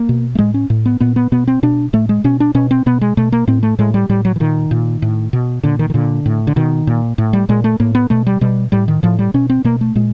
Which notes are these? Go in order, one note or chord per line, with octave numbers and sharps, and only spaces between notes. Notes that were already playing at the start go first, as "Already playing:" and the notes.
Already playing: A#3
B2
A3
A2 G#3
C#4
A2
B3
A#2 B3
B3
B2 B3
C4
B2 D4
A2 A3
G#3
B2 C#4
D4
B2 C#4
C4
B2 B3
G#3
B2 A3
A#3
A2 C4
A3
A2 G#3
G3
A2 G3
F#3
E3
A#2 D#3
A#2
A2
B2
A#2 D3
D#3
D#3
A#2 D3
A2
D3
B2 D#3
A#2
A2
G3
A#2 G#3
A3
A2 A#3
B3
B2 A3
G3
B2 G3
A2 G3
D#3
A2 F3
G3
B2 C#4
C4
B2 A#3
A3
A#2 G#3